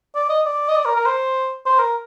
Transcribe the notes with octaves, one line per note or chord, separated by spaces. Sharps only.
D5
D#5
D5
D#5
D5
A#4
A#4
C5
C5
A#4